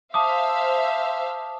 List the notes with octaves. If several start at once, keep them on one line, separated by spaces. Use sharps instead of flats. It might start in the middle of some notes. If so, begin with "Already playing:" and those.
C5 E5 F5 A5 D6 D#6